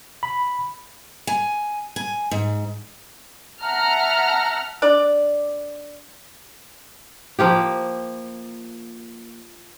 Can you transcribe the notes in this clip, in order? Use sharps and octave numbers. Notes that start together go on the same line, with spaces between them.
B5
G#5
G#5
G#2
E5 F#5 A5 A#5 F6
D4 D5
F3 A#3 G4